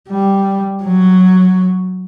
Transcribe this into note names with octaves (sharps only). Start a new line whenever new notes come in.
G3
F#3